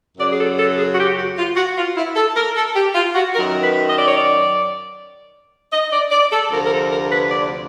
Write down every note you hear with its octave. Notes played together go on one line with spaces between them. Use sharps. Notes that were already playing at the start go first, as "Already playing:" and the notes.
F#2 C#3 F#3 D5
G#4
A4
A4
G#4
F#4
G4
F#4
F4
F#4
F4
E4
A4
A#4
A4
G4
F4
F#4
F#2 D#3 F#3 A#4
B4
D#5
D5
C#5
D5
D#5
D5
D5
A4
D2 C3 F3 A#4
A#4
A4
A#4
B4
D5